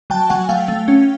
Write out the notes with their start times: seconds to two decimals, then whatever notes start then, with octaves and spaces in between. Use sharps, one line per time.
0.10 F#3 G5 A5
0.30 F#3 F#5 G#5
0.49 A3 F5 G5
0.68 A3
0.88 C#4